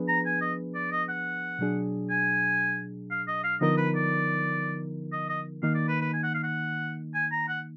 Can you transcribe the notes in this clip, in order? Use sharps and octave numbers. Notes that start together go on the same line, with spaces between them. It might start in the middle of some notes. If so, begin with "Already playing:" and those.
Already playing: F3 B3 D4 G#4 B4
A#5
G#5
D#5
D5
D#5
F#5
B2 F#3 D4 G#4
G#5
F5
D#5
F5
D3 F3 B3 D#4 A#4 D#5
B4
D5
D#5
D#5
D#3 A#3 D#4 F5
D5
B4
B4
G#5
F#5
F5
F#5
G#5
A#5
F#5